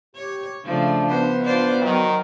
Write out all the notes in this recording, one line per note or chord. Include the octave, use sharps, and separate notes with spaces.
G4 C#5
C#3 F3 A3 D4
B3 C5
D4 F4 C5 D5
D#3 F#3 F#4